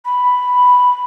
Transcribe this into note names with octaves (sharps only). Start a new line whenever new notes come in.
B5